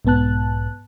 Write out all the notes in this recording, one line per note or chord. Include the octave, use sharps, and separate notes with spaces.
B1 G#2 B3 A5 F#6